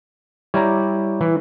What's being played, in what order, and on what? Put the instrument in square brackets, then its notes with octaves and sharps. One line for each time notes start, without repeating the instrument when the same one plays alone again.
[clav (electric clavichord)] G3 D5 A#5 [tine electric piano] E4 C#5
[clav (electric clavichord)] E3